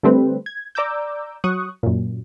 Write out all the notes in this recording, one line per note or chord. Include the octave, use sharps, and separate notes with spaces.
D3 G3 A3 C4 B4
G#6
D5 A#5 D6 E6 G6
F#3 C#6 D#6 F#6
F#2 A#2